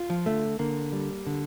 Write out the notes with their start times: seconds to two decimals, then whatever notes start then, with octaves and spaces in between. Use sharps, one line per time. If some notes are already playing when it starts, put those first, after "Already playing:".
Already playing: F4
0.10 F3
0.26 D3 A3
0.59 D3 A#3
0.92 G3
1.27 D3